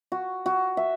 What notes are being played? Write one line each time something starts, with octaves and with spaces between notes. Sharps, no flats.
F#4
F#4
E5